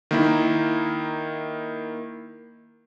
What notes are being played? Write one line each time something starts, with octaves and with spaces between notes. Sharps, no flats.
D#3 A#3 E4